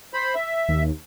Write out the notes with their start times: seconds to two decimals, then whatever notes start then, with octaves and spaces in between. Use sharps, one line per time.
0.14 C5 B5
0.35 E5
0.69 D#2